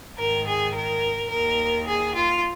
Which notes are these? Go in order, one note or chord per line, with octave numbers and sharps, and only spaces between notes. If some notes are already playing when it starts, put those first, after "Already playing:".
G#2 D#3 A#4
G#4
A#4
D#2 D#3 A#4
G#4
F4